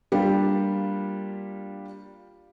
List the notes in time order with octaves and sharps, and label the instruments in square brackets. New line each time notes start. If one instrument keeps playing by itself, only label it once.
[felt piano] G3 A#3 D4 F4 G4